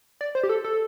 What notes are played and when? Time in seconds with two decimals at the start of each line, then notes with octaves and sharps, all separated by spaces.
0.21 D5
0.35 C5
0.43 G4
0.49 A4
0.64 A4